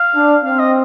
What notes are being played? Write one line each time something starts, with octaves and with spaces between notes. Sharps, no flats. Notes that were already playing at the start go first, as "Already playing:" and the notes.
Already playing: F5
D4
C4 F5
D#5